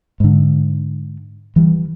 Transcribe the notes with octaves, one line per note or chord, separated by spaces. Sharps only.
G#2 D3
E3 G3